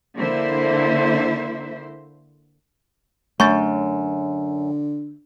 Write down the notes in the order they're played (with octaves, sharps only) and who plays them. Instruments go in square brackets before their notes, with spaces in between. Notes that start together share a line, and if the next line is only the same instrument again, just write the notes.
[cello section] D3 A#3 E4 C5 E5
[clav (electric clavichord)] F#2 [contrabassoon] D3 [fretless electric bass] A3 [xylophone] C#6 G6 A6